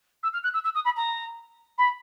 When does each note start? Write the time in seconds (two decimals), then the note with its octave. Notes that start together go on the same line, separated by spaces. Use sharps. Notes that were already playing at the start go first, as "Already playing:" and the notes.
0.23 E6
0.33 F6
0.43 F#6
0.53 E6
0.64 E6
0.74 D#6
0.84 B5
0.96 A#5
1.77 B5